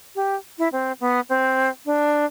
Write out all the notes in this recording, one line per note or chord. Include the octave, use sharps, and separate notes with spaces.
G4
E4
C4
B3
C4
D4